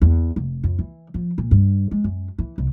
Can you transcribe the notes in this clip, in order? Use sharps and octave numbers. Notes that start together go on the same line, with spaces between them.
E2
F1
F2
E3
F3
A#2
G2
G#3
F#2
E3
C2